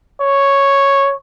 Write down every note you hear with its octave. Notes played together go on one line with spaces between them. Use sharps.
C#5